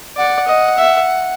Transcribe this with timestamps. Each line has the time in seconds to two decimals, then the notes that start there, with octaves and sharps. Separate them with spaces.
0.17 D5 F#5
0.48 D#5
0.78 E5